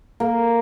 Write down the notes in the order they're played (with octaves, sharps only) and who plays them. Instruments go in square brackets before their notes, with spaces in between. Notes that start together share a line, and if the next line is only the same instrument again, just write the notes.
[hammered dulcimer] A#3